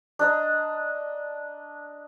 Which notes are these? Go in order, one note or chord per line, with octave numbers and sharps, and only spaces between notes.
D4 D#5 A#5